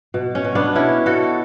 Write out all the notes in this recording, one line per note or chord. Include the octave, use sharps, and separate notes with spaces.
B2
C#4
B2
B3 D4
B2 C#4 E4
B2 F#4 A4